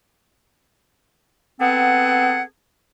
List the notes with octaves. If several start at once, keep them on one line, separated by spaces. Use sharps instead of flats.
B3 C4 G#4 A4 F#5